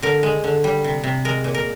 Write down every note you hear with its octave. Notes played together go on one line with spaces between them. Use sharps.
D3 A#4
G#3
D3
G3
C3
C3
G#3 A#4
A#2
A#4